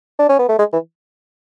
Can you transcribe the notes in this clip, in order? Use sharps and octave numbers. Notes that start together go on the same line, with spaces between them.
D4
C#4
B3
A3
G#3
E3